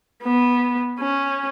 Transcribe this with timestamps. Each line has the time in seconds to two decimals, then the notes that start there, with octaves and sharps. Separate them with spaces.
0.23 B3
0.99 C#4